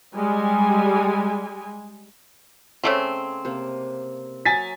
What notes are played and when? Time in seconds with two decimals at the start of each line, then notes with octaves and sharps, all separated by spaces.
0.15 G3 G#3 G#5
2.84 C#3 A3 C4 C#4 A4 D5
3.45 C3 A#3
4.45 F#3 G#5 A#5 A6 B6